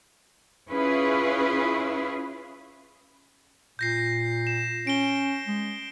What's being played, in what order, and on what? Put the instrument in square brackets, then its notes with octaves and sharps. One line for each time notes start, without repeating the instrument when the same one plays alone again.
[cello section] C#4 E4 F4 G#4 B4
[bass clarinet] A#2 [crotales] G6 A#6 C7
[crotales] E7
[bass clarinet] C#4 [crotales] D7 G7
[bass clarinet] G#3